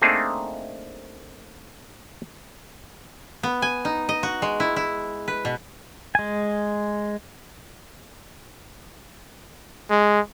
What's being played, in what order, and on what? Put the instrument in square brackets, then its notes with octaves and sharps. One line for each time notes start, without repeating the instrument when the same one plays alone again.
[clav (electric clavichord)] A3 A#3 C4 D4 D#4 G#4
[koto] B3
G#5
D#4
D#5
F#4
G#3
E4
E4
B4
B2
[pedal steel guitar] G#3 G#5
[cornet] G#3